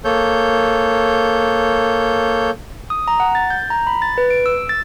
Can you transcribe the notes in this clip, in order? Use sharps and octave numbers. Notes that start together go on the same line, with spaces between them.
A#3 A4 C#5 G6
D#6
A#5
F#5
A6
G6
A#5
B5
A6
B4
D7
E6
A6